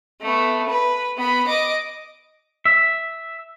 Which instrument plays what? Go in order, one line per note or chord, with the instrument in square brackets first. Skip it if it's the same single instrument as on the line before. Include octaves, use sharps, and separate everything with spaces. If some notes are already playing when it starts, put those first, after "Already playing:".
[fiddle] A3 B3
B4
B3 B5
D#5 D6
[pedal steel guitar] E5